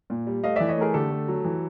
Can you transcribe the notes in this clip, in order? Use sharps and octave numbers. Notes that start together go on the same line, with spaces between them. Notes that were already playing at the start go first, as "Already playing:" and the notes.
A#2
G3
A3 D#5 F5
E3 D5 E5
C#5 D#5
A3 G#4 A#4
D3 G4 A4
A3
F#3
E3